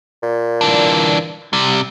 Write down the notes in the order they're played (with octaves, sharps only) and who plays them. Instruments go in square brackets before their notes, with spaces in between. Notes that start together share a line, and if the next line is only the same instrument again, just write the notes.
[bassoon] A#2
[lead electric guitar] E3 D4
C3 G3